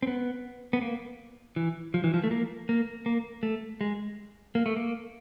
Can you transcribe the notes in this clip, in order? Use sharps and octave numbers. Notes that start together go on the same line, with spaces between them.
C4
B3
B3
A#3
E3
F3
E3
F3
A3
A#3
A#3
A#3
A3
G#3
A#3
A3
A#3